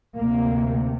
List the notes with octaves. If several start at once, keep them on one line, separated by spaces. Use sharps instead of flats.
D2 C3 A#3